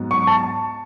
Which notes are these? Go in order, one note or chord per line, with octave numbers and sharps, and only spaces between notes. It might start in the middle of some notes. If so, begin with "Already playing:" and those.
Already playing: G#2 F#3 B3
C#6
A5